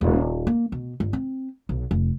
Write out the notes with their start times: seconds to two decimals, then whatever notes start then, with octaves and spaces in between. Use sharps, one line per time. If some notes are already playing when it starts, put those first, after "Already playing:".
0.01 D#1
0.47 A#3
0.72 B2
1.00 G1
1.13 C4
1.69 B1
1.91 F1